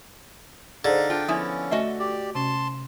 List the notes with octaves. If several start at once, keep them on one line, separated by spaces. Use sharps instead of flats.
D3 D#4 G#4 C5 F5
D4 F4 G5
F3 B3 C#4 E4 G#5 D#6
A3 F#4 D#5 E5
G4 D5
C3 C#4 A5 C6